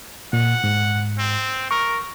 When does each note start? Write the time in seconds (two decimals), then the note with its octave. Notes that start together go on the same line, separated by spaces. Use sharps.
0.33 A#2 F#5
0.64 G#2
1.18 C4
1.71 A#4 C#6